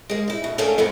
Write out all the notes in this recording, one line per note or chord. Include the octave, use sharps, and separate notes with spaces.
G#3 A#3
D#4 E4
B2
A3 A#3 C#4 D4 G#4 A4
F2 G#2 G#3 B3